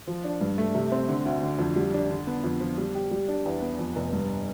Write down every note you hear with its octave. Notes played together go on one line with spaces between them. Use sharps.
F3
D4
G2
A3
C3
C4
D3
D2
D3
F2
G3
D4
D3
B3
F2
F3
G3
G4
G3
D4
E2
B3
F2
F1
G2